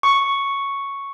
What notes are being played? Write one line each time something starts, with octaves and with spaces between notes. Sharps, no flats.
C#6